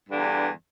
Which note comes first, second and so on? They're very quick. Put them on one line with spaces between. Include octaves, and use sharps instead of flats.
G2 D3 E2